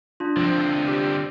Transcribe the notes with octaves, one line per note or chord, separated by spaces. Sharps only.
D4 F4
D3 F3 C4
G4